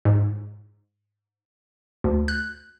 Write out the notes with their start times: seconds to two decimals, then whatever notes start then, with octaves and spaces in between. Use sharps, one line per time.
0.05 G#2
2.04 D2
2.28 F#6